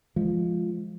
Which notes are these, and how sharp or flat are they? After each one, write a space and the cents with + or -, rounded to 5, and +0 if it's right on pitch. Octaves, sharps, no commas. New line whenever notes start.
F3 +0 G#3 +10